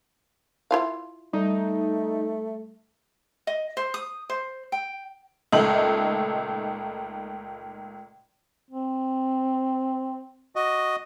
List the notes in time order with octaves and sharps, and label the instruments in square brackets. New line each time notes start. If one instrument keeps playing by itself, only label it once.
[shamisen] E4 F4 F5
[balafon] G3 [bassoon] A3 [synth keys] D#4
[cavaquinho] D#5
C5
D#6
C5
G5
[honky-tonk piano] C#2 A#2 A3 D#4 F#7
[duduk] C4
[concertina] F#4 D#5